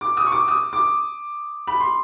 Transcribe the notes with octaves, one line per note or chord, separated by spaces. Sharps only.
D6
D#6
C#6
D6
D#6
D6
B5
C6